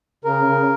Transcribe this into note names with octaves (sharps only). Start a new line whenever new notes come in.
C#3 A#4
C#3